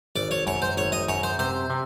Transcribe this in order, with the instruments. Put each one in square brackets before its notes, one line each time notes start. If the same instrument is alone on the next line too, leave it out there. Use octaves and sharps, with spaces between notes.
[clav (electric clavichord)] G#1 [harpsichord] D5
[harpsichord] C#5
[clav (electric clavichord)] F#2 [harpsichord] C#5
[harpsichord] C5
[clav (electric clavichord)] G#1 [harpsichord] C#5
[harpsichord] D#5
[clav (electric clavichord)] F#2 [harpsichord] C#5
[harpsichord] C5
[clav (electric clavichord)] C3 [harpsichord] C5
[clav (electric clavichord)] C3